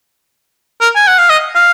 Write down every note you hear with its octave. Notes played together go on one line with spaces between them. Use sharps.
A#4
G#5
F#5
F5
D#5
F5